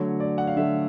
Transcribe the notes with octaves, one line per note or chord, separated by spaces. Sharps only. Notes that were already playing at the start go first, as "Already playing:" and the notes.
Already playing: D3 F#3 A3 C#5
D5
F#5
F5
D3 F#3 A3 E5